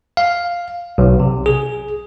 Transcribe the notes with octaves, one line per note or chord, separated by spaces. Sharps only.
F5
B1
C3
G#4